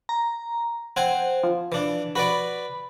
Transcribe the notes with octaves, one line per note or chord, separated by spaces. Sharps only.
A#5
C4 C5 F#5 G#5
F3
E3 D4
F#4 B4 D5 B5